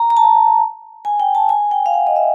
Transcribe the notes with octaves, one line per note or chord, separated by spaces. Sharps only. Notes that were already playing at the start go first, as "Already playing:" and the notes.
Already playing: A#5
A#5
A5
G#5
G5
A5
G#5
G5
F5
F#5
D#5
E5